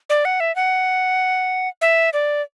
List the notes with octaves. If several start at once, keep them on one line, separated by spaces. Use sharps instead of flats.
D5
F#5
E5
F#5
E5
D5